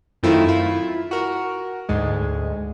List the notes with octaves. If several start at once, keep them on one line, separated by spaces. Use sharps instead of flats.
F#2 D#3 A3 C4 E4 F4
E4 F4
F#4 A#4
D2 G#2 G#3